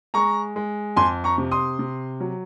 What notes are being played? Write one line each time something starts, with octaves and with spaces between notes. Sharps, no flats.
G#3 A#5 C#6
G#3
F2 G#5 C6
A#5 C#6
C3
C6 D#6
C3
F#3